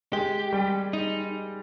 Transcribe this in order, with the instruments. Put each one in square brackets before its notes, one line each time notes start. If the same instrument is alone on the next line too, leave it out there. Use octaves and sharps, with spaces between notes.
[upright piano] G#3 [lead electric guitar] G4
[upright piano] G3
[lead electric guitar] D#4